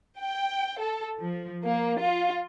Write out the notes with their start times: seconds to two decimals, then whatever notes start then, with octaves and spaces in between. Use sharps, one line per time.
0.19 G5
0.80 A4
1.20 F3
1.66 A#3
2.03 F4